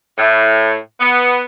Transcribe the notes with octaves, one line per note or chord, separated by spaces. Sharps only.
A2
B3